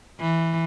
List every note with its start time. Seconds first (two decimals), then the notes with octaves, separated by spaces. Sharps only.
0.20 E3